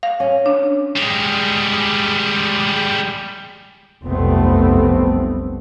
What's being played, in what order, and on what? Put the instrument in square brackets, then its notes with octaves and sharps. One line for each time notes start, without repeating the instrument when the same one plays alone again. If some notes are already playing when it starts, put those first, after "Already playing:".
[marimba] F5
[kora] C#4
[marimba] D4
[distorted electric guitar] G3 G#3
[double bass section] F1 B1 G2 A3 B3 C4